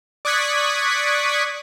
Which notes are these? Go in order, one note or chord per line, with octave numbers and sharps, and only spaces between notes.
D5 C#6 D#6 F#6 G#6 B6